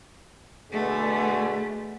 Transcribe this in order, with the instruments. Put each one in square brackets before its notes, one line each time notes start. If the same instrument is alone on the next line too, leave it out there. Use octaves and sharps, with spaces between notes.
[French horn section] B2 D3 G#4 [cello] A3